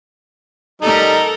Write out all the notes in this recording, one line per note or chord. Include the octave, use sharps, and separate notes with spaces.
G3 D#4 A4 A#4